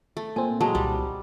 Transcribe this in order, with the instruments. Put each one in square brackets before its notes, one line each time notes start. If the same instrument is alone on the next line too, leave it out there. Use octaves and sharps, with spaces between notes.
[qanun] A3
[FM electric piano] A#2 C4 [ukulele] G#5
[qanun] F#3 G#3 [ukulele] E4 A5
[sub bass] C2 [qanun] G3